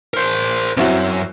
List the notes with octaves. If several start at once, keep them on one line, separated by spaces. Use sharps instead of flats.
A#4 C5
C2 F#2 C4 E4 F#4